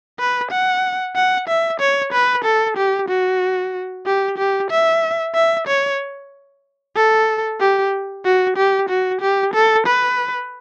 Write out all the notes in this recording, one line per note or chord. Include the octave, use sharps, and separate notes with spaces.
B4
F#5
F#5
E5
C#5
B4
A4
G4
F#4
G4
G4
E5
E5
C#5
A4
G4
F#4
G4
F#4
G4
A4
B4